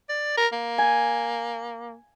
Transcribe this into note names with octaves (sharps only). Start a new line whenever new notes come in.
D5
A#4
A#3
G#5